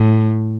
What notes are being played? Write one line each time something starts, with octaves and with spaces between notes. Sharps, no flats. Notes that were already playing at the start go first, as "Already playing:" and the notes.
Already playing: A2